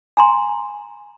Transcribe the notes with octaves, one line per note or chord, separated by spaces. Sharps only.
G#5 A#5 C6